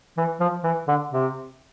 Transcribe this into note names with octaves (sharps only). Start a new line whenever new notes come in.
E3
F3
E3
D3
C3